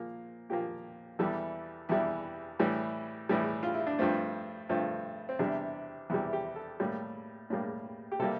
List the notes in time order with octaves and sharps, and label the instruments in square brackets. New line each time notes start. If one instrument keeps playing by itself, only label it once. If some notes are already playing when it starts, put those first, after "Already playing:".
Already playing: [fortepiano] A#2 F3 A#3
A#2 F3 A#3 G4
E2 E3 G3 A4
E2 E3 G3 E4
A2 E3 G3
A2 E3 G3
F4
E4
D4
G2 F3 A3 C4
G2 F3 A3 C4
C4
E2 C3 G3 D4
E2 C3 G3 E4
G4
A4
A2 G3 A#3
A2 G3 A#3
G4
C3 G3 A#3 A4